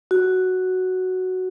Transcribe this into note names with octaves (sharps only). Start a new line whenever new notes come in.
F#4